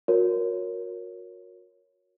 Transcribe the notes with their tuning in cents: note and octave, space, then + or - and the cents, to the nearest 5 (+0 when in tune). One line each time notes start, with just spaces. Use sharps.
F#4 -35 A#4 +5 C#5 +0